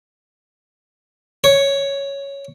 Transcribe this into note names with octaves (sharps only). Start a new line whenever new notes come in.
C#5